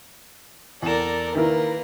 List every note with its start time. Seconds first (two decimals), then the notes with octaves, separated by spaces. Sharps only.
0.82 E2 A4 A#4 D5 E7
1.35 D#3 A#3 E4 A#4 B4